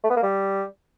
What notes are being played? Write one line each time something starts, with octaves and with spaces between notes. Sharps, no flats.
A3
B3
A#3
G3